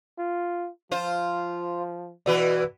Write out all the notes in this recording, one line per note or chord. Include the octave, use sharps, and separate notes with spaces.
F4
F3 F4 C5
B2 E3 F#4 B4 D5